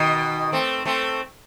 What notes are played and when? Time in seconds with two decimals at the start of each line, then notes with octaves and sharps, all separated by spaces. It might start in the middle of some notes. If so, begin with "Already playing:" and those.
Already playing: B2 D#3
0.52 A3 C4
0.86 A3 C4